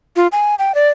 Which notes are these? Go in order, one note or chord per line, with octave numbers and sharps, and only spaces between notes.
F4
G#5
G5
D5